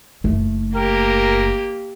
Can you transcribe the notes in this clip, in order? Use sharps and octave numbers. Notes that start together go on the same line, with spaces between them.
F#1 A3
A#3 G4 A#4